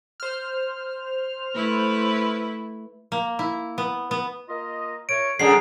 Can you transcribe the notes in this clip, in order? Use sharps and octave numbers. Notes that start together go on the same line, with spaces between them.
C5 F6
A3 E4 B4
A#3
E4
B3
B3
A#3 F4 D#5
E4 A#4 C#5 D7
F#2 D3 D#3 G3 G#4 C7